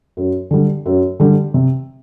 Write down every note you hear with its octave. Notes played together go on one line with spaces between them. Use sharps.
F#2
D3 G3
F#2
D3 G3
C3